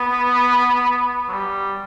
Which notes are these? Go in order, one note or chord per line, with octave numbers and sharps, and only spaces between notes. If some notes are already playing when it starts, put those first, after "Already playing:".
Already playing: B3
F#3
G3